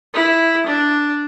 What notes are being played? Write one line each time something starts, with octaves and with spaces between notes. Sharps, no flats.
E4
D4